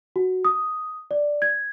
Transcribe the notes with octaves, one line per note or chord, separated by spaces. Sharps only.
F#4
D#6
D5
G#6